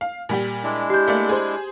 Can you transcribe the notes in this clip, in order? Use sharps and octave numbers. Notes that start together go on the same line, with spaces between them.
F5
A#2 G3 G4
G#3 D4 E4
G4 G6
A3 A#3 D5
G#4 C5